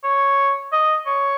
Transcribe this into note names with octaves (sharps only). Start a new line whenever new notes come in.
C#5
D#5
C#5